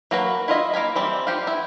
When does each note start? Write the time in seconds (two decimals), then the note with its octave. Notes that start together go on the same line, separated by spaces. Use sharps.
0.11 F#3 A#3 F#4 A#4 B4
0.48 E4 F4 D#5 E5
0.74 A#3 F5 G#5 B5
0.96 E3 G3 C4
1.27 F3 G4 F5
1.43 B3 E4